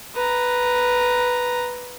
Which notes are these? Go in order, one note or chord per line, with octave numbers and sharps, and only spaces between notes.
B4 A#5